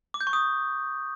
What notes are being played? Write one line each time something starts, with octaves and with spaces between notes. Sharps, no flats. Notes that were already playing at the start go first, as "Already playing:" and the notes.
D6
G6
C#6
D#6